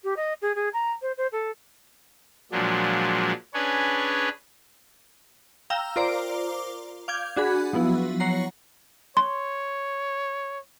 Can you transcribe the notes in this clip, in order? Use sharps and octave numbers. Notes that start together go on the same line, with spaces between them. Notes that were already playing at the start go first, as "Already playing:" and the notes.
G4
D#5
G#4
G#4
A#5
C5
C5
A4
A#2 F3 F#3 G#3 D4
C#4 D4 G#4 B4 C#5
F5 G5 A#5 E6
F4 A#4 C5 D5 A#5 D6
F5 D6 G6 G#6
D4 F#4 G#4 B5
F3 F#3 B3 E4
C#5 F#5 A#5 C7
C#5 C6